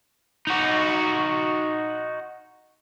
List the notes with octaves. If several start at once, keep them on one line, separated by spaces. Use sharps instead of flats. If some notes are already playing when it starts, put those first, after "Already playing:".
D#4 F#4